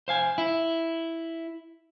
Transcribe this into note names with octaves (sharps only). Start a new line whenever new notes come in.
C5 F5 G#5
E4